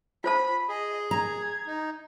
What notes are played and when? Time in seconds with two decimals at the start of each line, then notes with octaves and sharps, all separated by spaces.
0.24 F4 C5 A5 B5
0.69 G#4 D#5
1.11 A#5 G#6
1.67 D#4